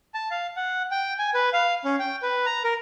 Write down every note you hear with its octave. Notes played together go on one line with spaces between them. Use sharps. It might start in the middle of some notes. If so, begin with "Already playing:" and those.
A5
F5
F#5
G5
G#5
B4
F5
C#4
G5
B4
A#5
A#4